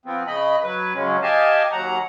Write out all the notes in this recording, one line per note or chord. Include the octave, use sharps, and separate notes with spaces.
F3 B3 C4
C#3 D#5 B5
F#3 B4
C#3 F#3 G#3 C#4
G4 D#5 F5 G#5 A5
D#2 F#3 F#5 A#5